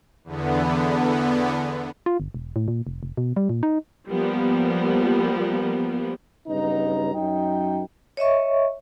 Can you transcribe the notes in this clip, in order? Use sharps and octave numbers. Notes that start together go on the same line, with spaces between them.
E2 D3 B3
F4
G1
E1
A2
A#2
F1
F1
B2
G3
A#2
D#4
F3 G3 A#3 B3
G2 C#3 F#3 B3 D#4 A#5
F#2 D#4 G5
C#5 D#5 E5 C#6